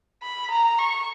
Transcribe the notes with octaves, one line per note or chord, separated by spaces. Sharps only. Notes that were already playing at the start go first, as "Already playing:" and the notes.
B5
A#5
C#6